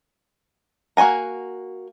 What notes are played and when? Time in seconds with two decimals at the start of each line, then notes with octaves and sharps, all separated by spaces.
0.97 A#3 F#4 C5 G#5 A#5